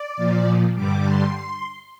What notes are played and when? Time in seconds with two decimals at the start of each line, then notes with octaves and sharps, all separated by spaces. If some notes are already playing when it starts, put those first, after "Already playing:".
Already playing: D5
0.17 A#2 F3
0.75 G2 D3 G3 D6
1.04 C6